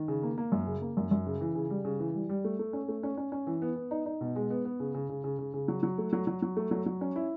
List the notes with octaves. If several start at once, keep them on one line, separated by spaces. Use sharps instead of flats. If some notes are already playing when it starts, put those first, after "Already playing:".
Already playing: D#3
C#3
A#3
A#3
F#2
C#3
A#3
F#2
F#2
C#3
E3
C#3
G3
C#3
E3
G3
G3
A3
A3
C#4
A3
C#4
C#4
C#4
E3
B3
B3
D#4
D#4
B2
G#3
B3
B3
C#3
C#3
C#3
C#3
C#3
C#3
F#3
F#3
A3
F#3
F#3
F#3
A3
F#3
F#3
C#4
E4